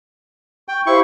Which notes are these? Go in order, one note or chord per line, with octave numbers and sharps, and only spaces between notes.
G5 C#6
E4 G4 C5 F5 C#6